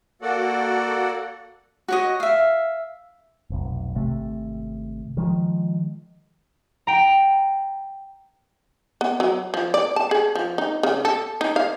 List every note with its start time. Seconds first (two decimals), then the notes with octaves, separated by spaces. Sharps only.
0.22 A#3 F#4 A4 D5 F#5
1.88 F#4 C#5 D#5
2.20 E5 F5
3.50 F1 B1
3.95 G#1 C3 A3
5.17 D#3 F3 G#3
6.87 G5 A#5
9.01 B3
9.20 F#3
9.54 F3
9.74 D5
9.96 A5
10.11 G#4
10.35 F3
10.58 D#4
10.83 C#3
11.05 A4
11.41 D#4
11.56 F5